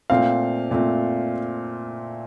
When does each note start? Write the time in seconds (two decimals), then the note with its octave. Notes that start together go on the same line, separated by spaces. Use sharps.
0.10 A#2 A3 C4 F5
0.71 A#2 A3 C4